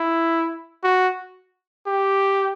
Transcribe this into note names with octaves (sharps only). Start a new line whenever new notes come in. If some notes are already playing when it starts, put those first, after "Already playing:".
Already playing: E4
F#4
G4